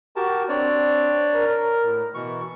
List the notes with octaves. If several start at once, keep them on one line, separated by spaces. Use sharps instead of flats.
F#4 G4 A#4 A5
C4 D4 C#5 D5
A#4
A2
B2 E3 C#6